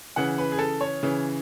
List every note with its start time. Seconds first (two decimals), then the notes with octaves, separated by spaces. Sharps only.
0.16 C#3 E3 F#5
0.38 B4
0.52 G#4
0.59 A4
0.81 C#5
1.03 C#3 E3